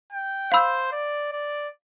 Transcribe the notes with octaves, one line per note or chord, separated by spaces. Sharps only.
G5
C5 F5 B5 E6 G6
D5
D5